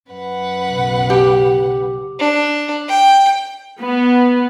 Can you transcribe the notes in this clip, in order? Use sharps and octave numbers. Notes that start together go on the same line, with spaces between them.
F#2 B4 F#5
B1 C#3
G4
D4
G5
B3